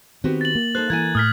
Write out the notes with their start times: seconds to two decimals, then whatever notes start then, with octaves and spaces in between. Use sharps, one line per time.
0.24 D#3 B3 C4 F#4 G4
0.41 A6 F#7
0.55 A#3
0.75 D#4 A4 C5 F#6
0.90 E3 A#3 E4 G#5 G#6
1.15 A2 D#6 F6 B6